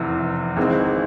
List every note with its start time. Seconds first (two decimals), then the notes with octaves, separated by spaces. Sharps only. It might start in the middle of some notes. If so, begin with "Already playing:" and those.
Already playing: F1 E2 C3 E3
0.57 G#1 G#2 E3 G#3 C4